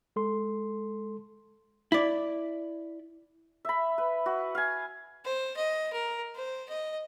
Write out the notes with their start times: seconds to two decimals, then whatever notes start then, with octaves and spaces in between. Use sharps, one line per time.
0.16 G#3 A4 C6
1.92 E4 D5
3.65 E5 B5
3.98 B4
4.26 F#4
4.55 F5 G#5
5.25 C5
5.57 D#5
5.93 A#4
6.35 C5
6.69 D#5